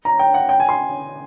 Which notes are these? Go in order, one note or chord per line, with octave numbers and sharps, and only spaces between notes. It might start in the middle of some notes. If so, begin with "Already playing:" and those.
A#5
G5
F#5
G5
G#5
C6